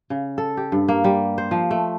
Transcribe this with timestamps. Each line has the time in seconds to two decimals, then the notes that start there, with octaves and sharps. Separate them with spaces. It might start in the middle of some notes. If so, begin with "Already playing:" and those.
0.10 C#3
0.38 A4
0.57 G4
0.72 G2
0.89 A#3
1.04 G3
1.38 C5
1.51 F3
1.71 A3